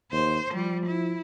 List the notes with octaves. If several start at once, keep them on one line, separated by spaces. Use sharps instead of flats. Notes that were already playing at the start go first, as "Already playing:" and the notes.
D#2 C5
F3 G3
E4